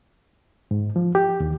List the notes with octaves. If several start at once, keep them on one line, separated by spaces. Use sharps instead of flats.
G#2
F3
G4
D#2